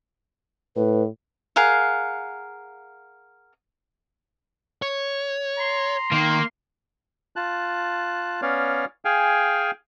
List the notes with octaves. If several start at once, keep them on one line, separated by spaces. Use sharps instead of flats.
A2 B4
G#4 A#4 F5 F#5
C#5
A#5 C6
D#3 A#3
F4 A5 F#6
B3 C#4 C#5 D5 F5
G#4 F5 G5 G#5